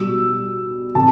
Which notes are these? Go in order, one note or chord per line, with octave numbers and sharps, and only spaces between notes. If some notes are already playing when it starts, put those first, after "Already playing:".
Already playing: B2 G3 E6
C3 A5